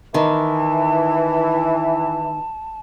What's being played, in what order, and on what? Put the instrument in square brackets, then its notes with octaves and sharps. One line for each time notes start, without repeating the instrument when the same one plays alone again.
[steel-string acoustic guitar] D#3 [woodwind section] E3 [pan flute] A5